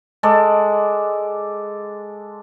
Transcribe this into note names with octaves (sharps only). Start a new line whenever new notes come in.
G#3 A4 D5